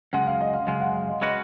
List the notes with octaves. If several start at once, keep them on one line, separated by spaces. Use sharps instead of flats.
F#2 C#3 G#3 F#5
F5
D#5
F5
F#2 C#3 G#3 F5
F#5
F5
D#5
G#3 C#4 F#4 B4 D#5